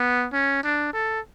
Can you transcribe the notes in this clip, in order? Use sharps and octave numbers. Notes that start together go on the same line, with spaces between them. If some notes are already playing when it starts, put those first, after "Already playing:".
Already playing: B3
C#4
D4
A4